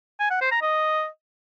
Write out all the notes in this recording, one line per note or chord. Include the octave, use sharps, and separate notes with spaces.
G#5
F#5
C5
A#5
D#5